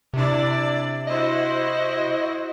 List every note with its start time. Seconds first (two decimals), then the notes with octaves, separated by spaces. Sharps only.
0.14 C3 D4 E4 D5
1.07 E4 F#4 C5 D#5